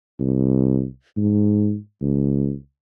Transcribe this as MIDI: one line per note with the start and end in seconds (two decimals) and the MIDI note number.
0.20 0.85 36
1.17 1.76 44
2.01 2.54 37